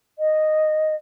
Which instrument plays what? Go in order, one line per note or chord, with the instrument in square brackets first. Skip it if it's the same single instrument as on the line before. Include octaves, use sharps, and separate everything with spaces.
[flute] D#5